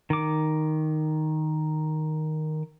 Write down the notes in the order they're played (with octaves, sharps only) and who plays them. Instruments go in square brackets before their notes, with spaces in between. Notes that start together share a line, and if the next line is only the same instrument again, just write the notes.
[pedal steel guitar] D#3 D6